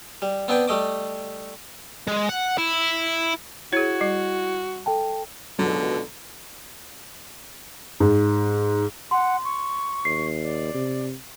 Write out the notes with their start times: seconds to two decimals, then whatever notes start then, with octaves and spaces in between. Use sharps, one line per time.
0.22 G3
0.48 B3 C4 D4 B4 G5
0.68 G3 A3 D#5 D6
2.08 G#3
2.29 F#5
2.58 E4
3.73 E4 F#4 G#4 C#5 G#6 C#7
4.01 G3
4.86 A4 G5 A5
5.59 C#2 B2 D3 F#3
8.00 G#2
9.11 F#5 C6
9.44 C#6
10.05 D#2 C7
10.42 D5
10.74 C3